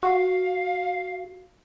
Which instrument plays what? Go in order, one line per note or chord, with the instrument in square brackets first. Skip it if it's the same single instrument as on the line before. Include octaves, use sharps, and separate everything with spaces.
[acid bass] F#4 [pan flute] F5